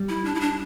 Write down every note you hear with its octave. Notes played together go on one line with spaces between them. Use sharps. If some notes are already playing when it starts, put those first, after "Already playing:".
Already playing: G3
E4
D4
E4
D4